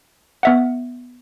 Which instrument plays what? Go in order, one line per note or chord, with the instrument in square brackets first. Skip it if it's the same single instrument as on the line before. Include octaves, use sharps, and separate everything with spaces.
[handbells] B3 E5 F#5